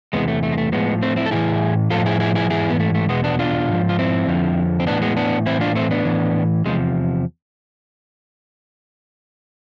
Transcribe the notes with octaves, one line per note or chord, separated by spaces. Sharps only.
E2 C3 E3 G#3 B3
A3
A3
G#3
A3
A2 F3 G#3 B3
A3 C4
C4 E4
A4
A2 E3 E4 G#4
A2 F3 F4 A4
E4 G#4
E4 G#4
E4 G#4
G#2 E3 E4 G#4
B3
A3
A3
E2 B2 G#3 B3
B3 D4
D4 F4
G#2 F3
F4
C4 E4
F2 D3 F3
C4
A2 E3 B3 D4
G#3 B3
B3 D4
A2 E3 C4 E4
D4 F4
A3 C4
B3 D4
A2 E3
E2 C3 F3 G#3